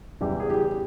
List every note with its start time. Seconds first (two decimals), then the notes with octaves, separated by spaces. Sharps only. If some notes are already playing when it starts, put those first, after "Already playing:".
0.21 E2 C#3 E3 G3 G4
0.40 G#4
0.50 G4